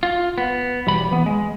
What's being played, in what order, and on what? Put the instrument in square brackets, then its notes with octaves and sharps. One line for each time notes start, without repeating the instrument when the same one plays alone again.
[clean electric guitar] F4
B3
B1 E2 G3 B5
E3 B3
G#3